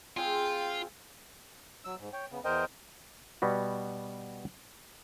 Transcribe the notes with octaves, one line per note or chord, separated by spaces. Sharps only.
C4 F4 G#4 F5 G5
F#3 E6
G#2
C#5 G5
C#3 B3
E2 A#4 C5 D#5 G5
B2 G3 B3 F#4